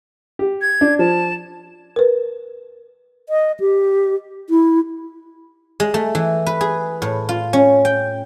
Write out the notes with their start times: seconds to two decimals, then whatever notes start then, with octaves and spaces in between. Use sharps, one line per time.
0.39 G4
0.62 G#6
0.81 D4
0.99 F3 A5
1.96 A#4 B4
3.29 D#5
3.60 G4
4.50 E4
5.80 G#3
5.94 A3
6.15 E3
6.47 B4
6.61 G#4
7.02 A2
7.29 F4
7.53 C#4
7.85 G5